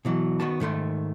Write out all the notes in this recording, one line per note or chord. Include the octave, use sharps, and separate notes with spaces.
B2 E3 F#3
D#3 B3 F#4 A5
G#2 D#3 A3 C6